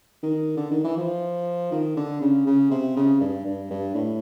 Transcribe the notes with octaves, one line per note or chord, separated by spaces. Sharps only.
D#3
D3
D#3
E3
F3
D#3
D3
C#3
C#3
C3
C#3
G2
G2
G2
A2